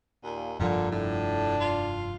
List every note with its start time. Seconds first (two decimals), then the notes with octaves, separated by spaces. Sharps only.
0.23 D#2 A#2
0.60 F1 G2 A#2 D3 F3
0.92 A2 D4
1.61 F4